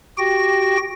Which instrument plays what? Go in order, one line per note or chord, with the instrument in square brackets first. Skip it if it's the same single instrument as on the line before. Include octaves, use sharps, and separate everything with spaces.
[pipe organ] F#4 G4 G5 A#6